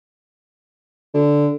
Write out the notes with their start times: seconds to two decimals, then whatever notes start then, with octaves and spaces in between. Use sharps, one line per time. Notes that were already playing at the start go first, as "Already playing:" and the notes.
1.14 D3